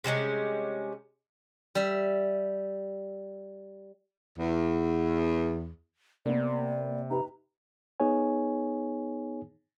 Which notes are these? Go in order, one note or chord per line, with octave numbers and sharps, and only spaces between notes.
C3 G3 G#3 C#4
G3 E5
E2
C3 A#3 B3 D5
D#4 G4 B4 A#5
B3 D#4 G#4 C#5 G#5